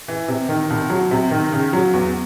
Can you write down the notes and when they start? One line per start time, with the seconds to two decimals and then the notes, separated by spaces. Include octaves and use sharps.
0.08 E3
0.28 C3
0.49 D#3
0.70 C2
0.90 F#3
1.11 C3
1.31 D#3
1.52 C#3
1.73 F#3
1.93 E2